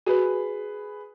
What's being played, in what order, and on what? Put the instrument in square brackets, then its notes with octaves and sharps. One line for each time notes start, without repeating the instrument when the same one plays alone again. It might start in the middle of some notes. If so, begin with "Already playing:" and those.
[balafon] F#4 [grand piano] G#4 B4